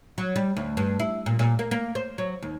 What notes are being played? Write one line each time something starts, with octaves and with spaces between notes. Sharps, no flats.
F#3
G3
D2
G2
E4
A#2
A#2
A#3
A#3
C5
F#3
D#2